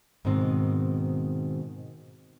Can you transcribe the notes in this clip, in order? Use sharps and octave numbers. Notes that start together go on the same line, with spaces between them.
G#2 B2 D#3 C4